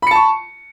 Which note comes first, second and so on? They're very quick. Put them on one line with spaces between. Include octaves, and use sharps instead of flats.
B5 C#7 A5 C#6